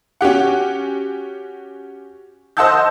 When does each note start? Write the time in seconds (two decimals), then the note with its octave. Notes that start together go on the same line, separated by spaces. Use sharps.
0.21 C#4 F#4 G4 F#5
2.57 C5 D#5 F#5 A5 E6 G6